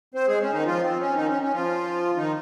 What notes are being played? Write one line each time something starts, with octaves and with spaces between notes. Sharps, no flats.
C4 C5
G#3 G#4
C#4
D#3 D#4
F3 F4
C4
C#4
D#3 D#4
C#4
C#4
F3 F4
D#3 D#4